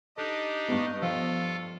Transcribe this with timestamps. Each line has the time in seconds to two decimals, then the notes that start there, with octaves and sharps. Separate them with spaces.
0.17 D4 D#4 G4 A4 D#5 F6
0.69 G2 B3
1.02 F3 F4 A4 F5 G5